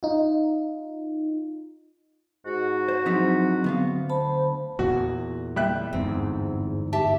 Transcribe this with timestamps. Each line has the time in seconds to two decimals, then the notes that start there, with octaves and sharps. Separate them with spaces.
0.03 D#4 F4
2.45 G#2 F#4
2.88 C5
3.06 F3 F#3 C4 D#4 E4
3.64 D2 B3 F5
4.10 C5 A5 B5
4.79 E2 A#2 F#4
5.56 G3 E5 F#6
5.93 G1 E2 G#2 C4
6.93 G4 E5 A5